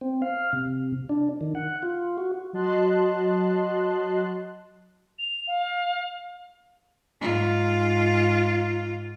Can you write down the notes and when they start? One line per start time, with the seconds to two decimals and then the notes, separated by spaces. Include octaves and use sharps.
0.01 C4
0.22 F5
0.53 C3
1.09 D4
1.41 D#3
1.55 F#5
1.83 F4
2.18 F#4
2.53 F#3 F#4 D#5 A5 C6 F#6
5.19 F7
5.47 F5
7.21 G#2 F4